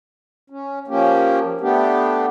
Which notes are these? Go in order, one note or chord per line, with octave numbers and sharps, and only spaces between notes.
C#4
F3 A#3 C#4 G4
A3 B3 D4 G4